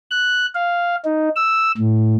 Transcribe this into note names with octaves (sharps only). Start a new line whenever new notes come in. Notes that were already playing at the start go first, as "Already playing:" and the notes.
F#6
F5
D#4
E6
A2